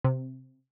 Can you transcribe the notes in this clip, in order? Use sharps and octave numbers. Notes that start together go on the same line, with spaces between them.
C3